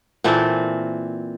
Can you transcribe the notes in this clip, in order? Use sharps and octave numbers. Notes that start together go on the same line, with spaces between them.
A#2 E3 C4 A4